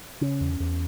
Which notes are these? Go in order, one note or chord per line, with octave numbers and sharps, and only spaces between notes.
C#3 C#4
E2
E2